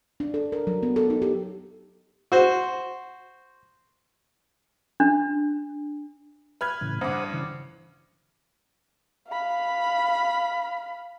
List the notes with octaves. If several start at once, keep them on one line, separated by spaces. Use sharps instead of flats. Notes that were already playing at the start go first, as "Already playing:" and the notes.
D4
A4
A#4
F#3
B3
A4
D#4
G4
F#4 C5
D4
B4 F6 G#6
A2 C#3 E3
G2 C5 F#5 D6 D#6
C#3 E3
F5 B5